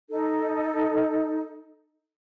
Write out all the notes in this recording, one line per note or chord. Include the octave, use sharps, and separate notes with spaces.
D#4 A4